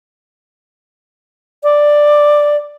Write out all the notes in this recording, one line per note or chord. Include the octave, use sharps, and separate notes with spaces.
D5